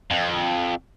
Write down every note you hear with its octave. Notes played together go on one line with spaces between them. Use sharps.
F2